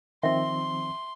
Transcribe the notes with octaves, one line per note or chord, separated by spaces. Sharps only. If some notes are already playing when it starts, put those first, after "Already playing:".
D#3 F3 C4 E5 C6